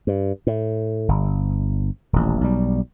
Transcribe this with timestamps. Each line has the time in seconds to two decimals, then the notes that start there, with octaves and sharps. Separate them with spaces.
0.07 G2
0.47 A2
1.08 G1
2.13 D#1 A1
2.41 B1 G3